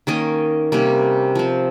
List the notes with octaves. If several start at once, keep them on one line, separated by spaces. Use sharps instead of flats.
D#3 A#3 C#4 D#5
C3 G3 A#3 C#4
F3 C4